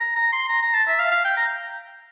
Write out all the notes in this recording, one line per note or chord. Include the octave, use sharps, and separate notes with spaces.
A#5
A#5
C6
A#5
A#5
A5
E5
F5
F5
G5
A#5